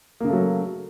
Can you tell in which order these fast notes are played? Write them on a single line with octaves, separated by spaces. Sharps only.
A#3 C#3 A3 F#3